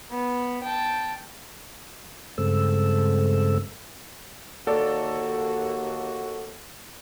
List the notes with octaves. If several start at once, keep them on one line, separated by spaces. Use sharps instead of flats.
B3
G5 A5
G2 C#3 G#3 C4 A4 E6
D#2 A#3 F#4 A4 D5